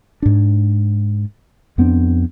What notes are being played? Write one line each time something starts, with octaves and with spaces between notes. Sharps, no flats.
G#2 D4
F2 B3 C4 D4